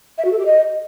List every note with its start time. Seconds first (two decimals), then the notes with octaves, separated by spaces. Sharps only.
0.18 E5
0.25 F#4
0.32 A4
0.39 G4
0.46 D#5